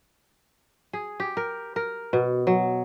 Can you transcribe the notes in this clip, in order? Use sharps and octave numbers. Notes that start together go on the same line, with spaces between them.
G#4
G4
A#4
A#4
B2
F#3